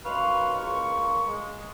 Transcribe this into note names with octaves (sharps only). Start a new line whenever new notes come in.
F#2 D#4 B4 F5 C6 C#6
C#2 A#3 C5 C#6
G#3